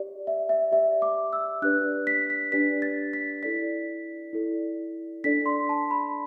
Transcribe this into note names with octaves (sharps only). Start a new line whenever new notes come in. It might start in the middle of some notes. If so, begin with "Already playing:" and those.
Already playing: G4 D5
E5
E5
G4 D5 E5
D6
E6
D4 G4 B4 D5 F#6
B6
B6
D4 G4 B4 D5 B6
A6
B6
E4 A4 D5 B6
E4 A4 D5
D4 A4 D5 B6
C6
A5
B5